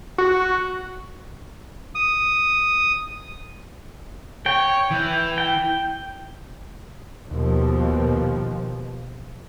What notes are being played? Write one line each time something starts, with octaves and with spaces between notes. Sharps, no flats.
F#4
D#6
C#5 G5
E3
G5
D#2 B2 F3